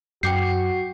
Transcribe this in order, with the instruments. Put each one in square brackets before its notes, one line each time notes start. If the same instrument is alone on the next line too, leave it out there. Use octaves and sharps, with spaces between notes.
[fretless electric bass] F#2 [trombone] F#4 [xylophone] G5 D6 G6 [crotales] C7